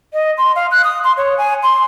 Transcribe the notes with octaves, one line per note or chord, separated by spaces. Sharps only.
D#5
C6
F5
F#6
D#6
C6
C#5
G#5
C6